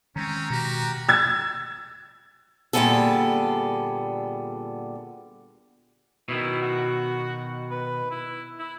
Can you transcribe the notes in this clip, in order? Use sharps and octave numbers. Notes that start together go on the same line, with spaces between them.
D#3 G#3 C4 C#4 A#5
B2 F#4 G4 A#4
E6 G#6 A6
A#2 D3 G3 B3 G#4 A4
B2 D#3 E4
F#4
B4
E4
E4